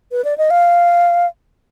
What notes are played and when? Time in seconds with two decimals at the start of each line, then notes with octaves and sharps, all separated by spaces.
0.12 B4
0.25 D5
0.38 D#5
0.50 F5